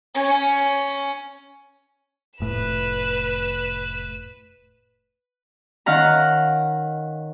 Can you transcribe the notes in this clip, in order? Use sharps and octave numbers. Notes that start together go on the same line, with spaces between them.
C#4
F1 A2 B4 E7
D#3 C#4 F5 F#5 A#5